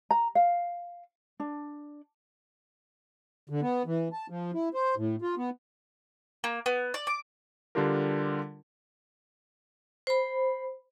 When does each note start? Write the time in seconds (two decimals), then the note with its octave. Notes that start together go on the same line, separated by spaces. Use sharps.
0.11 A#5
0.35 F5
1.40 D4
3.49 D3
3.62 B3
3.86 E3
4.13 A5
4.30 F3
4.54 E4
4.74 C5
4.97 A2
5.22 F4
5.37 B3
6.44 A#3
6.66 B3
6.94 D5
7.07 D6
7.75 D3 G3 D4 F4 G4 A#4
10.07 C5 B5